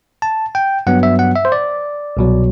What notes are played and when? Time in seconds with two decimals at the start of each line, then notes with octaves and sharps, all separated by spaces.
0.22 A5
0.55 G5
0.87 G2 F#3 B3 F#5
1.03 E5
1.19 F#5
1.36 E5
1.45 C5
1.52 D5
2.17 C2 B2 F#3